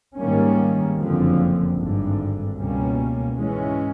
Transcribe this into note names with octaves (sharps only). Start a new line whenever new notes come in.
G#2 D#3 G3 A#3 C#4
F#1 F2 D3 F3
G#1 G2 D3
C#2 B2 G3 A#3 C#4
G#2 E3 G#3 C#4